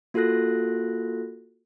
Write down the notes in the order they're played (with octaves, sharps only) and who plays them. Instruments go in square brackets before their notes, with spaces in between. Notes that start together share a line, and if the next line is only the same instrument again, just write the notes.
[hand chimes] A#3 F4 F#4 A4 F#6 A#6